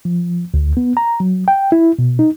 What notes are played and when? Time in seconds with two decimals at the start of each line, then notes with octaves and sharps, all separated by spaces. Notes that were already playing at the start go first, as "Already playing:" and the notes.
0.05 F3
0.54 D2
0.77 B3
0.97 A#5
1.20 F#3
1.48 G5
1.72 E4
1.99 B2
2.19 D#4